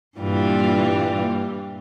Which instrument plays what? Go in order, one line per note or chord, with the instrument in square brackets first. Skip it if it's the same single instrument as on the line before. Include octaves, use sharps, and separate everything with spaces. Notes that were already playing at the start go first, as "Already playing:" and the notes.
[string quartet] G2 A#2 E3 G3 F4